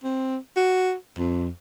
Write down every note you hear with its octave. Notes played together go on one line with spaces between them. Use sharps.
C4
F#4
F2